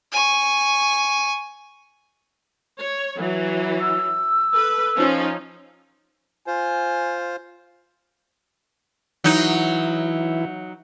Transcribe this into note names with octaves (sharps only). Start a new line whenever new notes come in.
G#5 C#6
C#5
E3 F#3
E6
A4 B4
F3 C#4 D#4
F4 C5 G#5
E3 F#3 D#4 E4